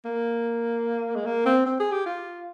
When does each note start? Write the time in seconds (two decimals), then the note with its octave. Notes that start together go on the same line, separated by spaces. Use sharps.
0.05 A#3
1.16 G#3
1.26 A#3
1.46 C4
1.66 C4
1.80 G#4
1.92 G4
2.06 F4